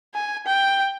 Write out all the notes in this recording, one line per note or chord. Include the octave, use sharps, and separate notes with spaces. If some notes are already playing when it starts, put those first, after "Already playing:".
G#5
G5